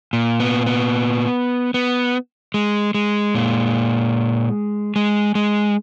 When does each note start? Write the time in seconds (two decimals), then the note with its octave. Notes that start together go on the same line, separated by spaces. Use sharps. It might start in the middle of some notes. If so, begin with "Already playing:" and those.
0.13 A#2
0.40 B3
0.66 B3
1.74 B3
2.54 G#3
2.94 G#3
3.35 A#2
4.96 G#3
5.35 G#3